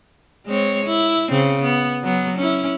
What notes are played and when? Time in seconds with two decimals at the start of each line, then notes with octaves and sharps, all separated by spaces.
0.46 G#3 C4 C#5
0.86 E4
1.30 C#3 C4
1.62 B3
2.04 F#3 B3
2.37 C#4 E4